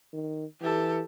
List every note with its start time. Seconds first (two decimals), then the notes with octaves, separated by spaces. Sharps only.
0.13 D#3
0.62 E3 G4 A4